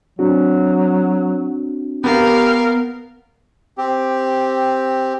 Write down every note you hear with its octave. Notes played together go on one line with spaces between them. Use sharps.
F#3 C4 D4 F#4
B3 G4 A#4 F5
C4 G4